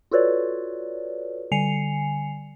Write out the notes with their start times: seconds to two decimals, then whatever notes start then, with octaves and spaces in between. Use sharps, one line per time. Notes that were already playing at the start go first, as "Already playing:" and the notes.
0.11 F4 F#4 A4 B4 C#5 D5
1.52 D3 G3 G#5 C7 C#7 F7